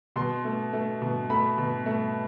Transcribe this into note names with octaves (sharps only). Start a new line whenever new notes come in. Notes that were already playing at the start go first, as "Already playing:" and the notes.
B2 C6
A3
A3
B2
A3 B5
B2
A3